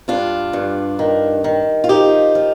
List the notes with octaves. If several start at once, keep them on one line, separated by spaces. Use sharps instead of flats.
G2 D4 F4
G2
D#3
D#3
F4
F3 D#4 G4
F3